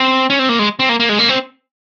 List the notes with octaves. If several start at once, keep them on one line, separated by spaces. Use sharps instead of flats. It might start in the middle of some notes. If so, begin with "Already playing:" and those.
Already playing: C4
C#4
C4
A#3
G#3
C4
A#3
A#3
G#3
A#3
C4